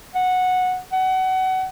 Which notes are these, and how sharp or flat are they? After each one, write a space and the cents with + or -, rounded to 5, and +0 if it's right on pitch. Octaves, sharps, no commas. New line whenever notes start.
F#5 -10
F#5 +25